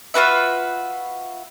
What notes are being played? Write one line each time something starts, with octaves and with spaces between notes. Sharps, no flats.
F4 F#4 B4 E5